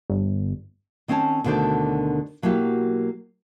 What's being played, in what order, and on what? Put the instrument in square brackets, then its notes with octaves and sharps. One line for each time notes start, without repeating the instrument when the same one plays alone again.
[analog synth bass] G1
[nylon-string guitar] D#3 C4 C#4 C#5 A5
D2 B2 D3 D#3 C5 D5
B2 F#3 A#3 E4 G4